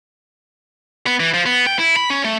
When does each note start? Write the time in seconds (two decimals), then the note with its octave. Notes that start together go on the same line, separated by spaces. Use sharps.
1.06 B3
1.20 E3
1.34 F3
1.46 B3
1.67 G5
1.79 E4
1.96 B5
2.10 C#4
2.24 A3